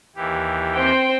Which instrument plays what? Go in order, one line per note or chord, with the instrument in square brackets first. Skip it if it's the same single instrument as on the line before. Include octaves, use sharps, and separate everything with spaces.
[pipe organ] D#2 E3 G4
[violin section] C4 C5 G5